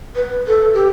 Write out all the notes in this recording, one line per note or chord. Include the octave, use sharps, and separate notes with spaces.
B4
A4
G4